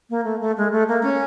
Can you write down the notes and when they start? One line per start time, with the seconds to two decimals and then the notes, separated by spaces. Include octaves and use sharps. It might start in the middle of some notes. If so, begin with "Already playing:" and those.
0.10 A#3
0.25 A3
0.41 A3
0.57 G#3
0.72 A3
0.88 A#3
1.04 C#4